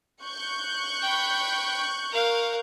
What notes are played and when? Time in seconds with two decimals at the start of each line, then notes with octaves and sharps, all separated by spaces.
0.22 C#6 F#6 G6
1.03 G5 B5
2.12 A#4 F5